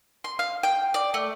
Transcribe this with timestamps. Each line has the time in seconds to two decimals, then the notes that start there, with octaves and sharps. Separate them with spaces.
0.24 C6
0.39 F5
0.63 G5
0.94 D5
1.14 A3